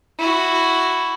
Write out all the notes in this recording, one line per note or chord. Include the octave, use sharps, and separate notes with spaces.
E4 F#4